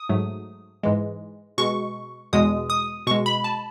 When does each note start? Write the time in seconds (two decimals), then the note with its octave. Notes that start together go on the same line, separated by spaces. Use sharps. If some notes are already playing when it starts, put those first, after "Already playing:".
Already playing: D#6
0.09 G#2 F#3 A3
0.83 G#2 E3 G#3
1.58 B2 G#3 C#6
2.33 E2 B2 G#3 D#6
2.70 D#6
3.07 B2 C#6
3.11 G#3
3.26 B5
3.44 A5